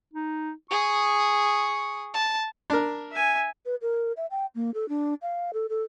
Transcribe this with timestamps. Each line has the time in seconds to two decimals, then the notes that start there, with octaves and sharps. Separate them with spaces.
0.14 D#4
0.71 G#4 C#6 D#6
2.14 A5
2.70 D4 A#4
3.12 E5 G#5
3.66 B4
3.82 A#4
4.17 E5
4.31 G5
4.55 A#3
4.74 A4
4.89 D4
5.22 F5
5.54 A4
5.69 A4